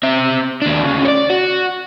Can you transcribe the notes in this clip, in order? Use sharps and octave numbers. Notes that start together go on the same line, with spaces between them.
C4 E5
D#2 D4
D2 C#3
C#5 D5
F#4